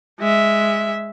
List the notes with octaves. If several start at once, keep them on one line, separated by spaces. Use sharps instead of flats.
G#3 E5